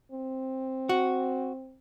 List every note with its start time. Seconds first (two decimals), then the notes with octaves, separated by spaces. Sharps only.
0.12 C4
0.89 F#4